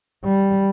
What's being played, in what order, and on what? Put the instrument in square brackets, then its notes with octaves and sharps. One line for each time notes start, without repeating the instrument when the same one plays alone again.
[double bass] G3